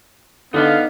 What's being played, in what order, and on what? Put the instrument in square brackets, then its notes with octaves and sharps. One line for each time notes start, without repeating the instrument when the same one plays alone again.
[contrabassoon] D3 [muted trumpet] B3 [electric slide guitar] D#4 D5 D#5 [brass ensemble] F5